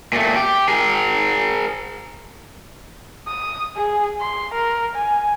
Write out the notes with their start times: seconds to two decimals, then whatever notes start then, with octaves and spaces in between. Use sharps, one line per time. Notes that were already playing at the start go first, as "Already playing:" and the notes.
0.13 A#2 A3
0.36 G4
0.68 G#4 A#4
3.27 D#6
3.77 G#4
4.20 C6
4.55 A#4
4.96 G#5